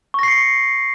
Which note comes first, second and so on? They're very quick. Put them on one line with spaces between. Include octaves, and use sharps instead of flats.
C#6 A#6 C7 C#7